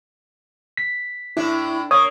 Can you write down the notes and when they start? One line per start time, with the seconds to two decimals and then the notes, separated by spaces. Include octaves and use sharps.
0.77 B6
1.37 A2 D4 E4
1.91 A#3 C#5 D#6